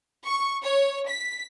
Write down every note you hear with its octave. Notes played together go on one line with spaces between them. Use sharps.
C#6
C#5
B6